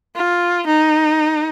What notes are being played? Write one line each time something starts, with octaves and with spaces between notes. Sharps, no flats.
F4
D#4